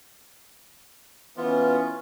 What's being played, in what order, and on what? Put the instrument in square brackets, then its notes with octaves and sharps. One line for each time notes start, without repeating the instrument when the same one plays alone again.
[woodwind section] E3 [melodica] B3 F4 [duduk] C#4